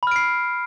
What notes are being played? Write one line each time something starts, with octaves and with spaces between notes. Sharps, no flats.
B5 F6 C7 D7